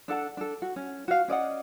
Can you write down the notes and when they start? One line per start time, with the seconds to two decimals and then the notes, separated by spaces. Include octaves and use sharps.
0.08 D4 A4 F#5 A5
0.37 D4 A4
0.62 F#4
0.76 C#4
1.08 F#4 F5
1.28 C#4 D5 D#5 F#5